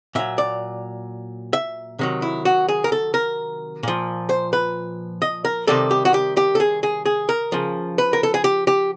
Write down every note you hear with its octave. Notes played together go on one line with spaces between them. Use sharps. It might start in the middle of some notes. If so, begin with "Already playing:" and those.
A#2 F#3 E5
D5
E5
C3 D#3 F#3
E4
F#4
G#4
A#4
A4
A#4
A#2 F3
C5
B4
D#5
A#4
C3 D#3 G3 A4
G4
F#4
G4
G4
A4
G#4
G#4
G#4
A#4
C#3 F3
B4
A#4
A4
G#4
G4
G4